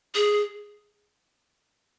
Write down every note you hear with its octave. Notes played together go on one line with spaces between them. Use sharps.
G#4